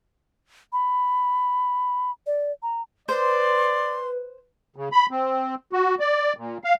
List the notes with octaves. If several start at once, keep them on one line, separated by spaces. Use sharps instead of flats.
B5
D5
A#5
B4 C5 D5 C6
C#3
B5
C4
F#4
D5
A#2
F5